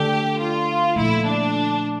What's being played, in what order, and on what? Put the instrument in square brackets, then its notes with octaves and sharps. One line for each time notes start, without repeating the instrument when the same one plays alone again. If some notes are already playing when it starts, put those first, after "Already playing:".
Already playing: [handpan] D3 A3 D4 A4 [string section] G4
[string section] F4
[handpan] A#2 F3 A3 [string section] E4
[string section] D4